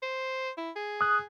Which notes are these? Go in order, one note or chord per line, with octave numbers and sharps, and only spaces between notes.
C5
E4
G#4
D#6 F#6